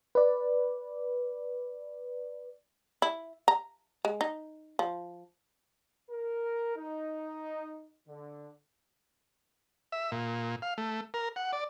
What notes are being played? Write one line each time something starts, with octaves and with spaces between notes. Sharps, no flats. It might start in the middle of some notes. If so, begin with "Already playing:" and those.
B4 D5
E4
A#5
G#3
D#4
F3
A#4
D#4
D3
E5
A#2
F5
A3
A#4
F#5
D5